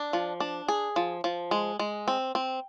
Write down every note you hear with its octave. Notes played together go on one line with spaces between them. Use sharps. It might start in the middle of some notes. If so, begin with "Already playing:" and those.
Already playing: D4
F3
D4
G#4
F3
F3
G#3
G#3
C4
C4